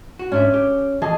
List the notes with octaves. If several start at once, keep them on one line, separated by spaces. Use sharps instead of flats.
F#4
G#2 C#4 D4 E5
G4
E3 G#4 D#5 A5